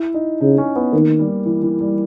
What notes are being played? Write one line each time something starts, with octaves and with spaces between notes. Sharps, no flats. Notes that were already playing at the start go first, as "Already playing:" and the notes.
Already playing: E4
D#4
C#3 D#4
C#4
B3
D#3 A#3
G3
E3
E3
G3